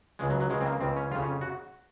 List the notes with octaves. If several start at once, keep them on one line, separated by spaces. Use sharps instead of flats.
C#2 C#3 G#3
F#3
F#3
C#2 C#3 G#3
C4
A#3
C#2 C#3 C4
C#4
F2 C#3 F4
C#4
F#4